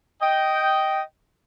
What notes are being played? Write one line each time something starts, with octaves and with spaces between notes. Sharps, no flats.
D#5 G5